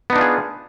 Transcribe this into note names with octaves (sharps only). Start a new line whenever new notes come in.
B3 D4 D#4 F4 G#4